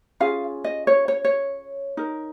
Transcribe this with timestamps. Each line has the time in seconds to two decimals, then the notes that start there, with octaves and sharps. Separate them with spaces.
0.20 C#4 F4 G#4 F5
0.64 D#5
0.87 C#5
1.08 C#5
1.24 C#5
1.97 D#4 A#4